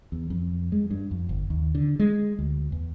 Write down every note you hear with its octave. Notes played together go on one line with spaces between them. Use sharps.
E2
F2
G#3
G2
F2
G1
D#2
D3
G#3
D2
E2